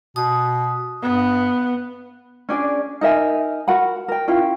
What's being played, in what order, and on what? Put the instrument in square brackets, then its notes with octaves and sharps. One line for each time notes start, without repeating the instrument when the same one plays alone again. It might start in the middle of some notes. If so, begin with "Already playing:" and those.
[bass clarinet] B2 [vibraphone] D#6
[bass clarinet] G2 [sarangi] B3
[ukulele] C#4 D4 G#4 D5
D#4 A#4 E5 G#5
F#4 A#4 F#5 B5
A#4 G5
C#4 E4 F4 G5